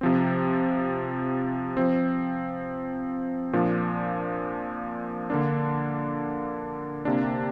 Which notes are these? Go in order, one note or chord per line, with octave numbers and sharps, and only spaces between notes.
C3 F3 C4
F3 C4
A#2 F3 D4
D3 A#3 D4
C3 A#3 D4